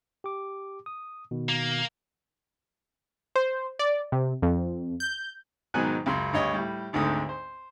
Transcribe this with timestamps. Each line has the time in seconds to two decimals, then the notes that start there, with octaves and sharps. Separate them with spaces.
0.24 G4 D6
0.86 D#6
1.31 B2 D#3
1.49 A#3
3.36 C5
3.79 D5
4.12 C3
4.42 F2
5.00 G6
5.74 G#2 B2 D#3 F#3 G#5 F#6
6.06 C#2 F#2 C6
6.33 D2 G2 C#5 D#5
6.54 A2 G3
6.93 G#1 D2 G#2 D3 D#6
7.29 C5